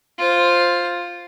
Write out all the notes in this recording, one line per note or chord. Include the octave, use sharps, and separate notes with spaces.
F4 C5